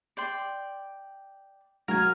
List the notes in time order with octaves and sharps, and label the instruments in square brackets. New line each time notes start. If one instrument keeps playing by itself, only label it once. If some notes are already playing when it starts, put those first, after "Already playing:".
[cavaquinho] D5 G5 C6
[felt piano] F#3 [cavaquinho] A#4 G#5 [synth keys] F6